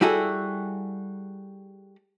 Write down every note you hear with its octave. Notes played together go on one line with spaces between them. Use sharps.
G3 E4 F#4 G#4 A4